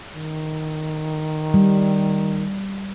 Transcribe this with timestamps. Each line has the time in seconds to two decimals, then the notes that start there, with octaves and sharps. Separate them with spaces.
0.16 D#3
1.54 G3